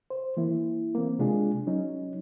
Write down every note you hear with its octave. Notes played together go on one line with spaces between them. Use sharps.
C5
E3 A#3 E4
A#3 C4
C3 G#3 D4 F4 G#4
F#3 C#4 D#4